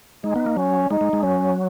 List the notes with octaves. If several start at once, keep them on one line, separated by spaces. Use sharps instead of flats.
G#3 D#4
B3
A#3
F#3 C#4
G#3 D#4
G#3
G#3
F#3 C#4